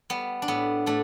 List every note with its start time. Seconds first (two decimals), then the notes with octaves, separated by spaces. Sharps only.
0.10 G3 B3
0.42 D4
0.48 A2 B3
0.86 A2 A3 D4